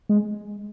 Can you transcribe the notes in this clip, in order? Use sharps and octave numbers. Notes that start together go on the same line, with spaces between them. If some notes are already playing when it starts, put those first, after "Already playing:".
G#3